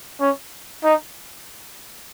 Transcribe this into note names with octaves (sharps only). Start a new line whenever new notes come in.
C#4
D#4